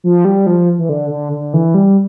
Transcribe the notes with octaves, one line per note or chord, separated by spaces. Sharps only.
F3
G3
F3
E3
D3
D3
D3
E3
G3